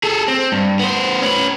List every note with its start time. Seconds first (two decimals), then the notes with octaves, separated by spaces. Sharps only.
0.03 G#4 A4
0.28 C4
0.52 G2
0.79 B3 C5
1.22 C#4 B4